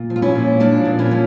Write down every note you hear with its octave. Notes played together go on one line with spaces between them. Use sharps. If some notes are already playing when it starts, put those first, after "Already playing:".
Already playing: A#2
F3
F4
C#4 E4
A#2
F3 A#3 D4
A#2
C#4 E4
F3